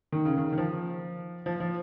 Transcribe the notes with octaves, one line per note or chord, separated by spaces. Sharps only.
D#3
C#3
D#3
D#3
F3
F3
F3